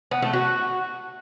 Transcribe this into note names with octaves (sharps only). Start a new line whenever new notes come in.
B3
A3
F#4